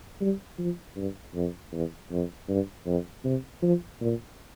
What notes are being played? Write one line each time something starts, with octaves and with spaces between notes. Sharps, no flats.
G3
F3
G2
F2
E2
F2
G2
F2
C3
F3
A#2